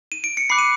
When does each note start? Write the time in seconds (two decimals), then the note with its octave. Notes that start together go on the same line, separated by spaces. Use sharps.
0.12 D#7
0.24 D7
0.37 C#7
0.50 B5 D6 F#6 C7
0.59 D#7